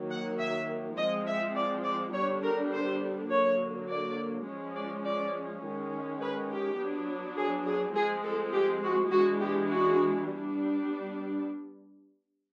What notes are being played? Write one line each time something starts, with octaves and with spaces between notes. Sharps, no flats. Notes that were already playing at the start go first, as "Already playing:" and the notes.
Already playing: D#3 F#3 A#3
F#5
E5
F3 G#3 C4 D#5
E5
D5
D5
D3 G3 B3 D4 C#5
A#4
C5
D3 F#3 A#3 C#5
D5
F3 G#3 C#4
D5
D5
D#3 G#3 C#4
B4
G4
F#3 B3 D4
G#4
G#4
F3 G#3 C4 G#4
A4
G4
F#4
E3 G#3 B3 D4 F#4
G4
F#4
G3 B3 D4